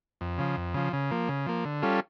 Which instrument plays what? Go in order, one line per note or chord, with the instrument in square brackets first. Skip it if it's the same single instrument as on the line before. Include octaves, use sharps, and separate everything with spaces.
[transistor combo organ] F2
C#3 F3
F2
C#3 F3
C#3
F3 A#3
C#3
F3 A#3
D3
G3 C#4 F4 A4